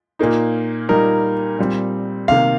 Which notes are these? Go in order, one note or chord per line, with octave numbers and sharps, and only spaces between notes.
A#2 A#3 D#4
A#2 G3 D#4 A#4
A#2 G3 C4
C3 D#3 A#3 F5